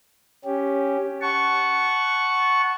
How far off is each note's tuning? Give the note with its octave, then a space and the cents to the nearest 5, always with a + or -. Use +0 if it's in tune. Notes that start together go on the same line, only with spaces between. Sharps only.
C#4 +0 G4 +0
F#5 +5 A5 -20 C#6 +0